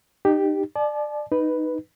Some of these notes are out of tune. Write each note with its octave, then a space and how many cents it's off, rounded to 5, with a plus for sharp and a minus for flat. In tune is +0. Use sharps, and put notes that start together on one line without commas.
D#4 -30 G4 +0
D5 +25 A5 -40
D#4 -5 B4 +0